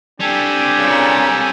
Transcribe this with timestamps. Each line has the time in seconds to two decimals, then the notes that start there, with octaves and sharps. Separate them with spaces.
0.20 G3 C4 D4 G4 A4 G#5
0.79 A#2 C#3